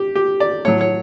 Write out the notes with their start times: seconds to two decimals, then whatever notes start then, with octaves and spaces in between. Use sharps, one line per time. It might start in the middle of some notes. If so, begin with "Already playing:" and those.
Already playing: G4
0.15 G4
0.40 D5
0.65 A2 F#3 C#5
0.81 C#5